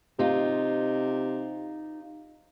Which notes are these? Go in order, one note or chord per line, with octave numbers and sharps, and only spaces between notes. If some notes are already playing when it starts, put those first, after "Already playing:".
C3 D#4 F4